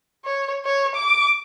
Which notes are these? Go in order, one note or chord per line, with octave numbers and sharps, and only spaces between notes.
C#5
C#5
D6